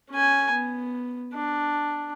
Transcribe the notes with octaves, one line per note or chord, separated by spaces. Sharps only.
C#4 G#5
B3
D4